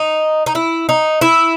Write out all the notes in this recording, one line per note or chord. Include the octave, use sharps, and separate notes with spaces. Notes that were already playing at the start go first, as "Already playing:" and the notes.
Already playing: D#4
D#4
E4
D#4
E4